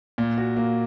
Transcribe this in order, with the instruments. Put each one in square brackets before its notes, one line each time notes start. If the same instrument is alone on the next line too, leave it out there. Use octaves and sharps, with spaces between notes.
[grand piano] A#2
F#4
A#3